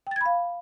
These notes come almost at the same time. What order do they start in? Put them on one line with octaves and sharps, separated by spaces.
G5 A6 G#6 B5 F5